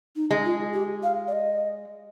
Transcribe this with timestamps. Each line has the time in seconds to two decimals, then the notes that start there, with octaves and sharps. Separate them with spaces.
0.16 D#4
0.31 G#3
0.45 F4
0.73 G4
1.03 F5
1.28 D5
1.33 D#5